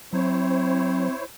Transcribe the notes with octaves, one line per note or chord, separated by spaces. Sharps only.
F#3 C4 E4 C5 C#5